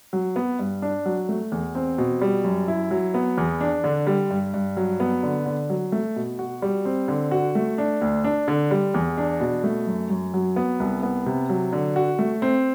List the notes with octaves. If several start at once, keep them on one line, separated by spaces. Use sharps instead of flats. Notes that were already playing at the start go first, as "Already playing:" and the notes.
F#3
B3
G2
D4
F#3
A3
E2
C4
B2
G3
F#2
E4
F#3
B3
E2
D4
D3
G3
G2
G2
F#3
B3
D3
D3
F#3
A3
B2
F#4
G3
C4
D3
F#4
A3
D4
D2
D4
D3
G3
E2
D4
B2
A3
F#2
F#2
F#3
B3
C2
B3
C3
F#3
D3
F#4
A3
C4